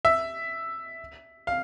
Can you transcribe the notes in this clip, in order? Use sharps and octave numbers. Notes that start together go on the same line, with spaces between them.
E5
F5